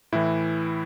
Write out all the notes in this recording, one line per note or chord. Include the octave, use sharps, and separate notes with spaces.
A2 E3 E4